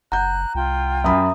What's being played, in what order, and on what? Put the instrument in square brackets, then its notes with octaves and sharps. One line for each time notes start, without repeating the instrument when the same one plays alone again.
[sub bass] F#1 [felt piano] F#5 G6 [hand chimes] A#5 [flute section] F#6
[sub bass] C2 [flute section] F4 G5
[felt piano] F#2 B5 [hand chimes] E5 A#5 D#6